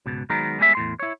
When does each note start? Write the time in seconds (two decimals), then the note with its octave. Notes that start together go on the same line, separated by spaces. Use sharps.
0.06 C#2 G#2 B2
0.30 D#3 F#3 G#3 B3 D#4 A#4
0.59 G3 G#3 B3 G#4 C5 E5
0.75 E2 A2 C6
0.99 E4 C#5